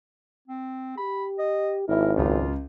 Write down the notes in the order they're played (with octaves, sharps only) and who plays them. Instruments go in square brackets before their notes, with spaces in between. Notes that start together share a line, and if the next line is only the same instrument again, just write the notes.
[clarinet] C4
[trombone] G4 [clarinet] B5
[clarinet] D#5
[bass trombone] G#1 [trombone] E4 [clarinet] A#4
[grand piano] C#2 C#3 [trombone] F#2 [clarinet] F4